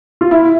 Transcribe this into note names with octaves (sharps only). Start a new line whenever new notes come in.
F4
E4